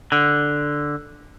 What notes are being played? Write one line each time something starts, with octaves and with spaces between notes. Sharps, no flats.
D3